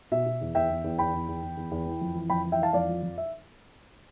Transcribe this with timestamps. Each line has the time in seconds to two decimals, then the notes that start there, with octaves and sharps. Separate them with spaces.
0.12 B2 E5
0.26 B2
0.41 E2
0.55 E2 E5 G5
0.70 E2
0.84 E2
0.98 E2 G5 B5
1.14 E2
1.29 E2
1.43 E2
1.57 E2
1.71 E2
1.86 E3
2.01 F2
2.15 E3
2.30 F2 G5 B5
2.45 E3
2.52 E5 G5
2.59 E3 F5 A5
2.73 F2 D5 F5
2.88 F3
3.03 F2
3.18 E5